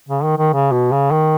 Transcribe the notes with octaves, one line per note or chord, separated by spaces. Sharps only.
C#3
D#3
D#3
C#3
B2
C#3
D#3